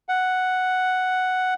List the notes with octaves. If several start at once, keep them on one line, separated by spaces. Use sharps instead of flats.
F#5